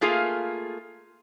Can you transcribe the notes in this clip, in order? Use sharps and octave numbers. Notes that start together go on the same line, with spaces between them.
A3 A#3 F4 G#4